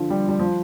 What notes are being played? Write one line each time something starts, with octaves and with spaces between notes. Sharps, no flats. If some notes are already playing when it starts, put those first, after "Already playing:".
Already playing: D3 F3
G3
G3
F3